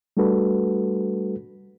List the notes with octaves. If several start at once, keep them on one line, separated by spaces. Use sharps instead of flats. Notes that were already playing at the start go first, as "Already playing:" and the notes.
G3 A3 D4 F#4 A4 B4